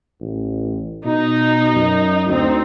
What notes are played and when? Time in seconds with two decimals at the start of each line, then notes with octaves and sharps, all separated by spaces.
0.21 A1
1.05 B2 D#4
1.76 F#2
2.28 D2 C4 D#4